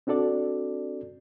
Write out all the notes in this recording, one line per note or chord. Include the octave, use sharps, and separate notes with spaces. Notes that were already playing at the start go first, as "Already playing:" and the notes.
C4 D4 F#4 A4 D5